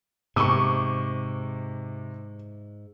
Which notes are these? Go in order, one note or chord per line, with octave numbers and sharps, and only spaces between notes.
G#2 C3 C#6 D6 E6 D#7